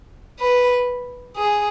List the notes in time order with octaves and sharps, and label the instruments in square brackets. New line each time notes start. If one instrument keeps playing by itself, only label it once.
[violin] B4
G#4